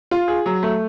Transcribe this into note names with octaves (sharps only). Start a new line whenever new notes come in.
F4
G#4
F#3
A3